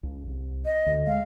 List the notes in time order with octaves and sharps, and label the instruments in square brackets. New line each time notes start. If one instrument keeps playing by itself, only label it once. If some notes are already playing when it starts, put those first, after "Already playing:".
[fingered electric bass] C#2
C2
[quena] D#5
[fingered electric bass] D2
[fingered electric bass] G#3 [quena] F5